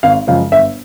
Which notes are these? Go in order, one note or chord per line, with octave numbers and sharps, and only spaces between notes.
G#1 F5
F#2 C#3 F3 G#3 F5
G1 E5